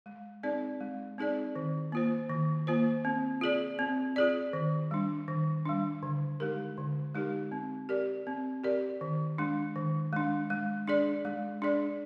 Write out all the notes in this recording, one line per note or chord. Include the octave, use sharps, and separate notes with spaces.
G#3
C4 D#4 G#4 D5
G#3
C4 D#4 G#4 D5
D#3
A#3 F4 C5
D#3
A#3 F4 C5
C4
F4 G#4 D5
C4
F4 G#4 D5
D#3
G3 D4
D#3
G3 D4
D3
G#3 D#4 G4 A#4
D3
G#3 D#4 G4 A#4
C4
G4 A#4 D5
C4
G4 A#4 D5
D#3
G#3 D4
D#3
G#3 D4
G#3
D4 G#4 D5
G#3
D4 G#4 D5